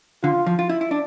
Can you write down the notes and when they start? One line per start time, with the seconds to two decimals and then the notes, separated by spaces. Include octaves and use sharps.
0.23 D3 F4
0.46 F3
0.59 F4
0.70 E4
0.81 E4
0.91 D4